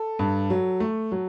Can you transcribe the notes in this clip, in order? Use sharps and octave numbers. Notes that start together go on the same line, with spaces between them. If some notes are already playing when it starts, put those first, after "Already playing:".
Already playing: A4
G2
F#3
A3
F#3